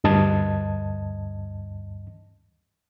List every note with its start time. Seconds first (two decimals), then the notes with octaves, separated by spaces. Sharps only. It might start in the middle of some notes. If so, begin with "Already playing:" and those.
0.04 D2 G2 D#5 A5 G#6